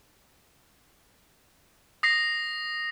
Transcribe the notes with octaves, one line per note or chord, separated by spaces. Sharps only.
D#6 A#6 C7